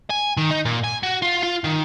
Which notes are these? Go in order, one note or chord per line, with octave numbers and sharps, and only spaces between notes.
G#5
D#3
D#4
A#2
G#5
F#4
F4
F4
D#3